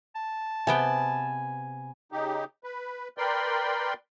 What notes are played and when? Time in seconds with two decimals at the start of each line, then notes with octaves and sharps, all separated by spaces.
0.16 A5
0.67 C3 B3 G5 G#5 B5
2.12 C#3 D#4 G4
2.64 B4
3.18 A#4 B4 D5 G5 C6